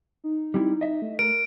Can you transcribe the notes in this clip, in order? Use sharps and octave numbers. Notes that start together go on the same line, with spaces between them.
D#4
G3 C4 E4
D#5 E5
A3
A#4 D7